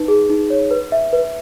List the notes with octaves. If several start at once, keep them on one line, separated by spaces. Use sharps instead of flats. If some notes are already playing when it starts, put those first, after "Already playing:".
Already playing: D#4 B4
G#4
D#4
C#5
B4
E5
B4